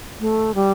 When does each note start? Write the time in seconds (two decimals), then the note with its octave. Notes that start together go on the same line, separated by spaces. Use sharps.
0.20 A3
0.55 G3